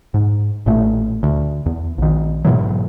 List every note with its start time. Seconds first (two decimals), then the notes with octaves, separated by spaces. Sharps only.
0.14 G#2
0.66 A1 A#2 A3
1.23 D2
1.66 E2
1.98 A#1 D#3
2.45 G#2 B2 E3 F#3